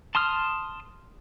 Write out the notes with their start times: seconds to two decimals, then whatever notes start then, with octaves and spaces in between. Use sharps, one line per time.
0.15 A5 C6 D#6 F6